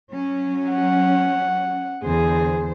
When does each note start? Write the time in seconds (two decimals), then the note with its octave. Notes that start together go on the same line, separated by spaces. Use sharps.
0.11 F#3 C#4
0.70 F#5
2.03 E2 D3 G#4 C5